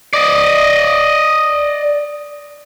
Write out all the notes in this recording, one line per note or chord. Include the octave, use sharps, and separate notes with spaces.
D5 D#5